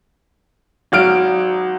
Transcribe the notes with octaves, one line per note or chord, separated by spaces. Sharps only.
G#1 F#3 F6 D7